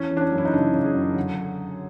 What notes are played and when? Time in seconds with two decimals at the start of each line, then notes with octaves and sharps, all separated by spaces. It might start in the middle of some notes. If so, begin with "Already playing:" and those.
Already playing: E3 C#4
0.11 E3
0.17 D4
0.21 C#4
0.32 F#2
0.38 E4
0.45 D#4
0.53 C#3 D4
0.74 C#3
0.84 G#4
0.95 F#2
1.16 D3